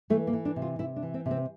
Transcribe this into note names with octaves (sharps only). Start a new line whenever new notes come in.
E3 A3
A#3
E3
D4
C3
F4
C3 E4
D4
E3
C4
C3
C4